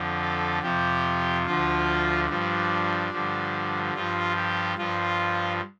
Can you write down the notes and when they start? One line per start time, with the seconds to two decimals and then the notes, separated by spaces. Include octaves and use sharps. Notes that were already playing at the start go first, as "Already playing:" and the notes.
Already playing: F2 D3 F3
0.21 A4
0.63 F2 C3 F3 G4
1.46 D2 D3 F3 F4
2.29 G2 F3 D4
3.12 G2 D3 F3
3.94 G2 F3 F4
4.37 G4
4.78 G2 F3 F4